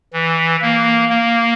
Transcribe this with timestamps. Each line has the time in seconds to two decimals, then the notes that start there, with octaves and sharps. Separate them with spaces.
0.13 E3
0.62 A#3
1.09 A#3